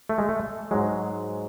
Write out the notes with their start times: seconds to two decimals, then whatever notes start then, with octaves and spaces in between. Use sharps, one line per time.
0.09 A3
0.18 G#3
0.29 A3
0.71 G#2 F#3 G#3